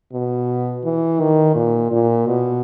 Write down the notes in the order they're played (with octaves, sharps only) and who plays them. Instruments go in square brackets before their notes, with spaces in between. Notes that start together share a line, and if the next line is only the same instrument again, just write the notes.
[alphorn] B2
E3
D#3
A#2
A#2
B2